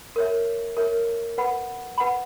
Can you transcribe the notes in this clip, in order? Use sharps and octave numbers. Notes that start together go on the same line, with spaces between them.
A#4 C#5 E5
A#4 C#5 E5
B4 F#5 B5
B4 F#5 B5